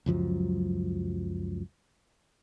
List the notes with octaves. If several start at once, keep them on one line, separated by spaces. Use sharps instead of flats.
C#2 F#2 F3 F#3